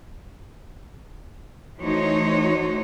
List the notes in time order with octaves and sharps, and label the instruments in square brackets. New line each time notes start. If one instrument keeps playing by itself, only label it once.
[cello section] E3 A3 D#4 F#4 C5 C#5